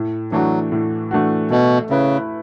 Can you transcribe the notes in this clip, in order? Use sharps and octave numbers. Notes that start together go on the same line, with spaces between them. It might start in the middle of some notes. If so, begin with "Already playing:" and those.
Already playing: A2
E3 F#3 A3 D4 F#4
A2
E3 A3 D4 F#4
B2 A3
C#3 E4 B4